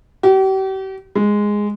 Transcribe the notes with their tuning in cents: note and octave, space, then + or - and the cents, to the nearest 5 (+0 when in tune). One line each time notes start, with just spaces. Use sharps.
G4 -40
G#3 -5